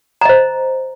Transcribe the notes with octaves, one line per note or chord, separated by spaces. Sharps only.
C5 D#5 A#5